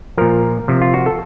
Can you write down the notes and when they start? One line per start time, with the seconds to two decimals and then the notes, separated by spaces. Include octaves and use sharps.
0.17 A#2 F3 A#4
0.68 C3 F3
0.82 F4
0.94 F#4
1.06 A4